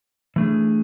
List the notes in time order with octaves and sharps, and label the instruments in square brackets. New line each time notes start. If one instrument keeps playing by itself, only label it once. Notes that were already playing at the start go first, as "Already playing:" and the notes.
[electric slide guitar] E3 A3 D4 G#4